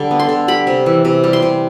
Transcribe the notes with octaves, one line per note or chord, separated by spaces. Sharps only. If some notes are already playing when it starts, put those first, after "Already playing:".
Already playing: D3 G3
B3
C6
D3
G3 B5
C3
E3
C3
G3
C6
C3